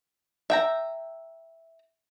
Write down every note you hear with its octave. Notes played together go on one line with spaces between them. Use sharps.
E5 G5 A#5